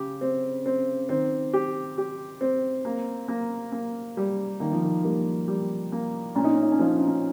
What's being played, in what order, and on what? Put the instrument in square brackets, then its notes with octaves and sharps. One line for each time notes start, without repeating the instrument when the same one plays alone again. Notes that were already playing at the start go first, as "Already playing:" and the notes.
Already playing: [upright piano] C#3 [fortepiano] G4
[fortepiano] C4
C4
[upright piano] D#3 [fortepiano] C4
[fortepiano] G4
G4
C4
A#3
A#3
A#3
G3
[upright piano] D#3 [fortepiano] A#3
[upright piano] F3
D#3
[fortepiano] G3 [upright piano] A#3
[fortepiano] G3
A#3
[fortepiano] A#2 [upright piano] C#4
[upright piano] D#4
C#4
D#4
C#4
[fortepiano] F3 [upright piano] D#4
[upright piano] C#4
D#4
C#4